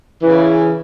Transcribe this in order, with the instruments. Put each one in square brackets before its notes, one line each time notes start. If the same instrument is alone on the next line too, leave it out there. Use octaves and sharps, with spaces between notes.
[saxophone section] C#3 E3